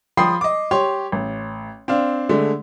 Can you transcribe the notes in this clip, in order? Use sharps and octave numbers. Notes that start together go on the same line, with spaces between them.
F3 G5 B5 C6 D#6 C7
D#5 D6
G4 C#5 C6
A1
C4 D4 F5
D3 G#3 A3